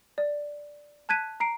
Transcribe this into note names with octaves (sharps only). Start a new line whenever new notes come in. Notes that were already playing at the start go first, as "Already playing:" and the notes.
D5
A5 F#6 G#6 B6 D#7
A#5 C7 D7